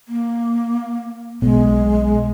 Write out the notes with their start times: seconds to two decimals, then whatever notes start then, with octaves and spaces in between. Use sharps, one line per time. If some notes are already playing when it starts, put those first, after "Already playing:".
0.08 A#3
1.42 B1 G#3 B3